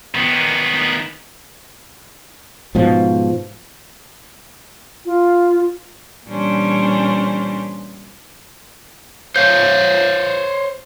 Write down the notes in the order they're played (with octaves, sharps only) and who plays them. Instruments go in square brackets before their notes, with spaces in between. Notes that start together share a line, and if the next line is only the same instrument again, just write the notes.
[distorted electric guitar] D#3 B3
[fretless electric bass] G#2 B2 F3
[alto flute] F4
[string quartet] A#2 E3 G3 C#4 D4 C5
[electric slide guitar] C5 C#5 F5 [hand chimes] G6